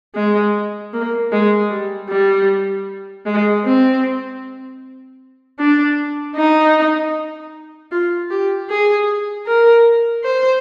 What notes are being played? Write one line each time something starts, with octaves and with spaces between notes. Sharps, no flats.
G#3
A#3
G#3
G3
G3
G#3
C4
D4
D#4
F4
G4
G#4
A#4
C5